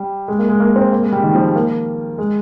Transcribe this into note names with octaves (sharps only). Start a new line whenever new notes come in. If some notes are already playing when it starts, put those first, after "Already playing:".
Already playing: G3
G#3
A#3
G#3
A#3
C4
A#3
G#3
G3
D#3
F3
G3
A#3
G#3